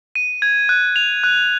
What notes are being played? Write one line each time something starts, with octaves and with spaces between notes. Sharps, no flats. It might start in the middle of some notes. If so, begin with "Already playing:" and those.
D#7
G#6
F#6
F7
F#6